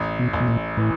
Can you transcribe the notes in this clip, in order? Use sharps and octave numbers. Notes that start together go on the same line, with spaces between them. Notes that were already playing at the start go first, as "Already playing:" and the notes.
Already playing: A1
B2
A1
B2
A#2
A2 E3